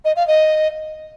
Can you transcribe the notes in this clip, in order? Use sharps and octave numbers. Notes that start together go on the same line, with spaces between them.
D#5
F5
D#5